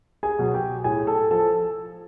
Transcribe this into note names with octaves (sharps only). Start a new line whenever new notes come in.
G#4 G#5
B2 F#3
G4 G5
A2 G#4 G#5
A4 A5
F3 A4 A5